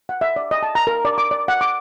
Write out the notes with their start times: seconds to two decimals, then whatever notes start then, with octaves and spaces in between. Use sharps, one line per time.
0.09 F#5
0.21 E5
0.36 D5
0.51 D#5
0.63 A5
0.75 A#5
0.87 A#4
1.05 D5
1.18 D6
1.31 D5
1.48 F#5
1.61 D6